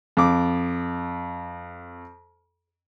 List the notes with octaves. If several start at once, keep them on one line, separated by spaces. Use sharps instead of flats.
F2 D6